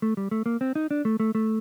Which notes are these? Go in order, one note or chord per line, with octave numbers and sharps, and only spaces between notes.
A3
G3
A3
A#3
C4
D#4
D4
A3
A3
A3